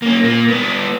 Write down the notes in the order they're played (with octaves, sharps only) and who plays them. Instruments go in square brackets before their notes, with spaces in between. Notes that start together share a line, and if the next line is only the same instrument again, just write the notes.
[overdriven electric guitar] A#3 C#4
A#2 A#3
B3 D4